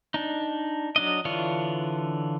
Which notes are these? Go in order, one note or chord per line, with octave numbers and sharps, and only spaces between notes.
D4 D#4
F#3 D4 D#5
D3 E3 D4 F4 C#5